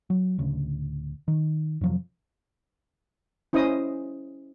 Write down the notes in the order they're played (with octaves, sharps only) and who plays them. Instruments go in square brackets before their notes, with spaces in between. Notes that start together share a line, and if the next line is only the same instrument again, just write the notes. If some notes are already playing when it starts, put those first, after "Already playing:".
[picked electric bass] F#3
D1 D2 C#3
D#3
F2 C3 F3 F#3
[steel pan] C#4 E4 C5 D#5 D#6